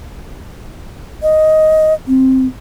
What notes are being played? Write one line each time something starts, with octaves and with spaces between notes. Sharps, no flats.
D#5
C4